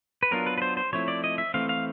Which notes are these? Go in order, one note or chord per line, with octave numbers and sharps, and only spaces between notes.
B4
F#3 B3 D4 F4 A#4
B4
B4
C5
C5
F3 A3 C4 E4 C#5
D5
D#5
E5
E3 A3 C4 F5
F5